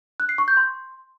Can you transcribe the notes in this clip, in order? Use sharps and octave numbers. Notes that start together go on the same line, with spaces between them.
F#6
C7
C#6
G6
C6